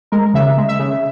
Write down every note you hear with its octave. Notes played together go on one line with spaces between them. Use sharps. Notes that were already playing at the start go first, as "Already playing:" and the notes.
G#3 A#4
C#3 E5
G#3
E5
C#3